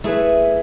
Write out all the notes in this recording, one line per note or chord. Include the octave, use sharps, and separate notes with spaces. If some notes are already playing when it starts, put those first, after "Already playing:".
A3 E4 G#4 B4 E5